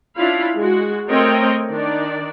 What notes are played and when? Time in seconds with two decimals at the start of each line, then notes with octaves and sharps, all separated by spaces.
0.16 C#4 D4 E4 F4 F5 B5
0.57 G#3 F#4
1.09 A3 C4 A#4 C#5 D#5 G5
1.70 D#3 D4 D5